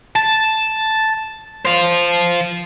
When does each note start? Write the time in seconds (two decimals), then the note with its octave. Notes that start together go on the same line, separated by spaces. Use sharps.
0.16 A5
1.65 C5 F5